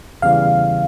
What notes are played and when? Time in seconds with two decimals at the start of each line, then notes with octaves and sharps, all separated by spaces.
0.22 E2 C#3 E3 G3 F5